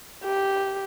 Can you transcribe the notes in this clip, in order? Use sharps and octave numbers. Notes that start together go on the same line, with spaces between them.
G4